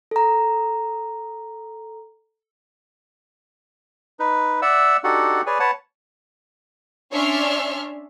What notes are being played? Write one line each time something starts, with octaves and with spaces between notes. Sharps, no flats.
A4 A#5
D#4 B4
D5 E5 F#5 E6
D4 D#4 F#4 G4 A4 F#5
G#4 B4 C#5 D5 G#5
B4 C#5 F#5 A5
C#4 D4 C#5 E5 C6 F6